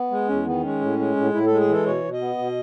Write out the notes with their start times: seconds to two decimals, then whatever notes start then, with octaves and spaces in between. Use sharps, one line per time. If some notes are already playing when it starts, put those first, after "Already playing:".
Already playing: B3
0.11 G#3
0.28 E2 C#4
0.46 D#3 B3
0.64 G#3 C#4
0.81 A2
0.99 G#3
1.16 A2
1.33 A2 E4
1.46 A4
1.51 G#3
1.60 G#4
1.68 E3 A4
1.86 B2 C#5
2.04 B2
2.13 D#5
2.21 B3
2.38 B2